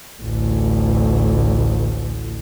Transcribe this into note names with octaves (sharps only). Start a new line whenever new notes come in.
A1 D2